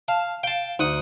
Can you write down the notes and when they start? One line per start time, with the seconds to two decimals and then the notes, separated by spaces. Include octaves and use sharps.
0.08 F5 A5
0.43 F5 G5 A5
0.79 D2 D#4 F#5 D#6